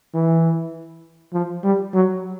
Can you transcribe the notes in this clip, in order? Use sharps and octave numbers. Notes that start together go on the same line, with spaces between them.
E3
F3
G3
F#3